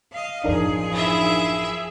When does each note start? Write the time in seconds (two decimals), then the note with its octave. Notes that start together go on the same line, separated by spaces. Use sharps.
0.11 D#5 F5
0.44 A1 F#2 F3 D4 D#4 G#4 A#4
0.92 E4 E5